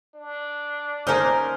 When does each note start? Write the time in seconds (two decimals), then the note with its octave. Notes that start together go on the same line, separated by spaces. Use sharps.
0.15 D4
1.07 A#3 C#4 D#4 A#4 C5 G#5 F6